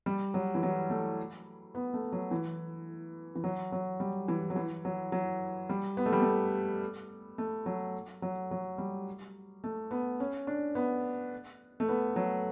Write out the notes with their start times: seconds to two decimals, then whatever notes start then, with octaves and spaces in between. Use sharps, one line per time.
0.06 G3
0.34 F#3
0.55 E3
0.63 F#3
0.90 A3
1.75 B3
1.94 A3
2.12 F#3
2.31 E3
3.35 E3
3.44 F#3
3.72 F#3
4.00 G3
4.28 E3
4.50 F#3
4.56 E3
4.85 F#3
5.12 F#3
5.69 G3
5.97 B3
6.06 A3
6.13 G3
6.22 A3
7.38 A3
7.66 F#3
8.22 F#3
8.51 F#3
8.78 G3
9.64 A3
9.91 B3
10.20 C#4
10.47 D4
10.75 B3
11.80 A3
11.88 B3
12.16 F#3